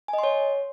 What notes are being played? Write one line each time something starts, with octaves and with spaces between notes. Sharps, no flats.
G#5
D#5
C6
C#5